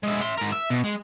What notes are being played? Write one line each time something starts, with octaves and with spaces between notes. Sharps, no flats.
G#3 E4
E5 C6
G#2 A#4
E5
B2
G#3